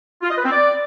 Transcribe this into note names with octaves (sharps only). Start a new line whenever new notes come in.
F4
D#5
B4
C4
D5